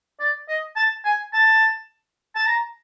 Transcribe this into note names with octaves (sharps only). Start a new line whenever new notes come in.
D5
D#5
A5
G#5
A5
A5
A#5